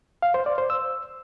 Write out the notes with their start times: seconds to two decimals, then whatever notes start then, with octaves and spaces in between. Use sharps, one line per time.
0.22 F5
0.34 C5
0.46 D5
0.58 C5
0.70 E6